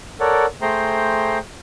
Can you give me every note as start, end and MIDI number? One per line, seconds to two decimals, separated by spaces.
0.20 0.46 69
0.20 0.46 70
0.20 0.46 73
0.20 0.46 74
0.20 0.46 78
0.62 1.38 57
0.62 1.38 68
0.62 1.38 72
0.62 1.38 79
0.62 1.38 82
0.62 1.38 84